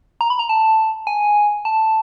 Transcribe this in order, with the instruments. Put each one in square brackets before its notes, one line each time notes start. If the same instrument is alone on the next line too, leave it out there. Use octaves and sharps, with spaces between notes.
[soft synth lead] A#5
B5
A#5
A5
G#5
A5